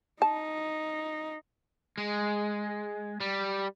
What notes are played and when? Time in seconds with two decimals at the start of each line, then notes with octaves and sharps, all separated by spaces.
0.22 D#4 A5
1.98 G#3
3.21 G3